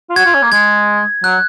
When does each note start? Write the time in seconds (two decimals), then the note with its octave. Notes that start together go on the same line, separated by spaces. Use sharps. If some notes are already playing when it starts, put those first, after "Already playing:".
0.10 F4
0.16 F#4 G#6
0.25 F4
0.34 C#4
0.42 A#3
0.52 G#3 G#6
1.24 F#3 F#6